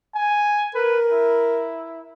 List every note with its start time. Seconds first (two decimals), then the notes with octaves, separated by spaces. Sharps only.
0.15 G#5
0.75 A#4 B4
1.12 E4